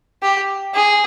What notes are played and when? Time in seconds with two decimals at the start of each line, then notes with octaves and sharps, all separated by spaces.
0.22 G4
0.74 G#4